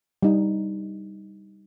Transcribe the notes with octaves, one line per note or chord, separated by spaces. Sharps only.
G3 D#4